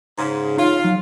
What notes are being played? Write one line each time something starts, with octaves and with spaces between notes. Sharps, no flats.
G#2 C#3
D#4 F4 C#5 F5
F#3